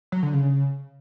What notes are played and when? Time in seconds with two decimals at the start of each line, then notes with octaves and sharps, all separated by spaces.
0.12 F#3
0.23 D3
0.33 C#3